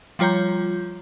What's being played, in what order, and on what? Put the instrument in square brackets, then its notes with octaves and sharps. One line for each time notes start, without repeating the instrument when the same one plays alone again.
[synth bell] F3 G3 F4 C#5 A#5 G6